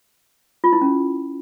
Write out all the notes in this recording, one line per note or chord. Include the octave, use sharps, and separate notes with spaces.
F4
E4
C#4